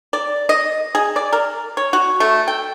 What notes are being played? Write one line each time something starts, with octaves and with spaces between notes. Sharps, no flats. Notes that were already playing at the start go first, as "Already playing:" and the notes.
D5
D#5
G#4
D5
A#4
C#5
F#4
A3
G5